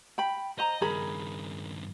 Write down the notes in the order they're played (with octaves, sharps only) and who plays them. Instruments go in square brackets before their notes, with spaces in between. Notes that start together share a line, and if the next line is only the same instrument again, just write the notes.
[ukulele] G5 B5
[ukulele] C5 A#5 [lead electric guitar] D#5
[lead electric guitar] G2 D#3 [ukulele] G#4 A#4 B5